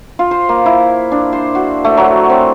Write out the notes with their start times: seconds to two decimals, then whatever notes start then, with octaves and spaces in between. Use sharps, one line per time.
0.19 F4
0.31 C5
0.49 A#3
0.66 E4
1.12 D4
1.33 C5
1.55 F#4
1.85 A3
1.97 F#3
2.30 C4